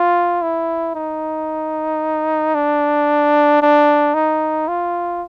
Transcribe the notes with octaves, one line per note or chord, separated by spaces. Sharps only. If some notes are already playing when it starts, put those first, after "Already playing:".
Already playing: F4
E4
D#4
D4
D4
D#4
F4